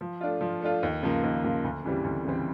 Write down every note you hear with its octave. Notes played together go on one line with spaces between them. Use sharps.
F3
A3 D4 F4
F3
A3 D4 F4
D#2
C#3 F3 A#3
D#2
C#3 F3 A#3
D2
C#3 E3 G3 C4
D2
C#3 E3 G3 C4